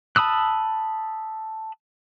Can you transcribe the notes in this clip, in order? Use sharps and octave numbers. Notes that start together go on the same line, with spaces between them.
A5 B5 D#6 E6 F#6